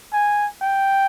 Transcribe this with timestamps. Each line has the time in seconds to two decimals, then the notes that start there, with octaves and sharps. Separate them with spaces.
0.13 G#5
0.61 G5